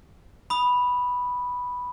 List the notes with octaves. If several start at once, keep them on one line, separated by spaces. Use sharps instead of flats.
B5 D#6